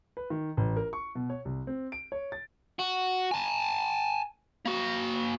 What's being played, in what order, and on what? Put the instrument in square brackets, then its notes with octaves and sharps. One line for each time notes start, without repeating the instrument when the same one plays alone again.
[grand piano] B4
D#3
A1
A#4
C#6
B2
C#5
C2
C4
D7
C#5
A6
[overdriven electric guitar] F#4
G#5 A5
A#3 F#4